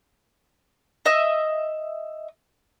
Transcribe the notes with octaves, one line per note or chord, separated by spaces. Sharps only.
D#5 E5 D#6